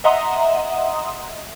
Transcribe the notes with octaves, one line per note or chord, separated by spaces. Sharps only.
D#5 E5 F#5 A#5 C6 D#6